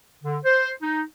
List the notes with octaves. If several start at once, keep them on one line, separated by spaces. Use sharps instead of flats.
D3
C5
D#4